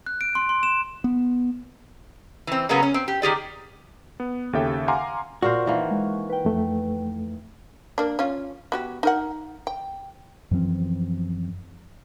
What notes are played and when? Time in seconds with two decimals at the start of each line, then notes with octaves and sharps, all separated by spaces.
0.06 F#6
0.21 D7
0.35 C6
0.49 C6
0.63 E7
1.04 B3
2.47 E3 C4
2.69 C#3 F#3 A#3 B3 G#4
2.83 C#4
2.94 C4
3.08 G4
3.22 D#3 G4 G#4 D5
4.20 B3
4.53 D#2 C#3 G4 A4 E5 G5
4.88 F5 F#5 G#5 A#5 C6 D6
5.42 A#2 F#4 A#4 C5
5.66 D#3 E3 A#3
5.91 G#3
6.29 B4 G5
6.45 F2 A3
7.98 A#3 D4
8.19 C#4 F4
8.72 B3 F#4 G4
9.03 D#4 A#4 F#5
9.67 G5
10.51 F#2 E3 F3 C4